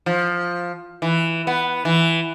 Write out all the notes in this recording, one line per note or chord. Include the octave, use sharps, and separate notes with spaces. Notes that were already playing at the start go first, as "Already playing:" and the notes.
F3
E3
B3
E3